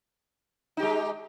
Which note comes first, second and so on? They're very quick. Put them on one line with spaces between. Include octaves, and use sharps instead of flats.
D#4 G4 G#3